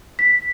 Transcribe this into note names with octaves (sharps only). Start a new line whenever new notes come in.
B6